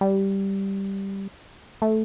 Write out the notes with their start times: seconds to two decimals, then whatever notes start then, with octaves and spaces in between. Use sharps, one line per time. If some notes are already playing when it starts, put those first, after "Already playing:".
0.01 G3
1.82 A3